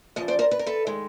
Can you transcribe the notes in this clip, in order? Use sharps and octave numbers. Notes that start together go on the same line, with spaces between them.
E2 C#3 F3 D#5
C5 D5
A#4 C5
B4
A#4
A4 B4
D#3 G#3